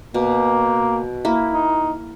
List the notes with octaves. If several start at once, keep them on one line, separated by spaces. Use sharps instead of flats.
B2 A#3
A#3 E4
D#4